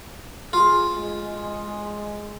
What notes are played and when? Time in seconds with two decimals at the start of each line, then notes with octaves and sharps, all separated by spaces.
0.53 F4 G#4
0.90 G#3